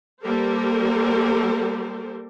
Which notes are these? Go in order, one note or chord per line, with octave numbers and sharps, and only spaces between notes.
G3 A#3 G4 A4 A#4 C5